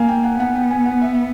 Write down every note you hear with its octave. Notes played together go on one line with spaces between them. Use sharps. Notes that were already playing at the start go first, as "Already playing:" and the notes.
Already playing: A#3 F5 G#5
G5
F#5
B3 F#5
G5
G#5
F#5
E5